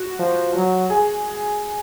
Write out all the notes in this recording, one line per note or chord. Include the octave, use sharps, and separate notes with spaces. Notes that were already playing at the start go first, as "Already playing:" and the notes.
Already playing: F#4
F3
F#3
G#4